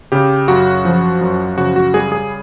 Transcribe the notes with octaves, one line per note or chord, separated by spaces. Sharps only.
C#3 G4
F#2 F#4
F3
F#2
C#3 F#4
F#4
G3 G#4
G#4